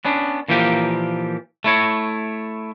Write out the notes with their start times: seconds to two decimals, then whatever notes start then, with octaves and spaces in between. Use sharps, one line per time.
0.05 B3 C#4 D4
0.48 A#2 E3 F3 A#3 G4
1.64 A3 E4 C#5